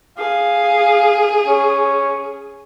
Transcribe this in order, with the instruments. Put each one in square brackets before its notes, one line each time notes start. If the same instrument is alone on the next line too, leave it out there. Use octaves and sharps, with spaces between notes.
[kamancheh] G#4 [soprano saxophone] F5
[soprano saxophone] C#4